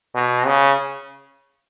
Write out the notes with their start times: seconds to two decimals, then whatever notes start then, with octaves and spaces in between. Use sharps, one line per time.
0.15 B2
0.46 C#3